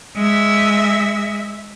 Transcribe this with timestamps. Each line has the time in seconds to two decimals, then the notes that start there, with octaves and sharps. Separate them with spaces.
0.15 G#3 E5